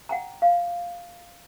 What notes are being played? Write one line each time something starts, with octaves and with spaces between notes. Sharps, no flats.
F#5 G5 A#5
F5